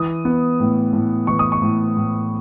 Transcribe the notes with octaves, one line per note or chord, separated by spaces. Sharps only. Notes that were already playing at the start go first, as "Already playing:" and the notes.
Already playing: E3 D#6
B3
A2
A2
E3 C#6
D#6
C#6
A2
A2